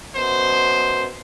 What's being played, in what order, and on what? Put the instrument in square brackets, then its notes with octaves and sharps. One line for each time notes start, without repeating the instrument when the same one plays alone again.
[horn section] F#2 B2 C5